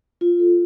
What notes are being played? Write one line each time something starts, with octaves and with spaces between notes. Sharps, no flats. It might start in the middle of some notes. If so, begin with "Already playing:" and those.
F4
A4